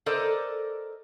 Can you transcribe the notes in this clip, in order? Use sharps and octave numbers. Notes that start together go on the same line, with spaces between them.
A4 A#4 C5 D5 D#5